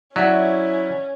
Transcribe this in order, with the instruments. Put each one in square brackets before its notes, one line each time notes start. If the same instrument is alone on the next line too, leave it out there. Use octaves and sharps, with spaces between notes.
[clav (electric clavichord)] F#3 [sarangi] C#4 [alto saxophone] E4 [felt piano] D5 E5 F#5